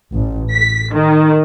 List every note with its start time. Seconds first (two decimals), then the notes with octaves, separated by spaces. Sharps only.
0.13 A1
0.53 B6
0.92 D#3